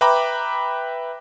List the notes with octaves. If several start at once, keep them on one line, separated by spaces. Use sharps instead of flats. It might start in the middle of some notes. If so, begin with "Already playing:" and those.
B4 E5 G5 A#5 B5 D6